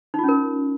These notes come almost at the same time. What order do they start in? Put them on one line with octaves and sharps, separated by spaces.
D#4 F4 C#4 A#4